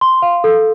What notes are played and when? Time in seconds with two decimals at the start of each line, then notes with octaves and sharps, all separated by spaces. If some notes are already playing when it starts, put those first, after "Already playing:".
0.01 C6
0.22 F5
0.44 A4